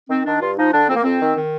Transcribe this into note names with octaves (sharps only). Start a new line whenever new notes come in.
D#3 C4
D#3 D4
G2 F4
F3 D#4
D3 D4
F2 C4
A#3
F2 C4
D#3
D#3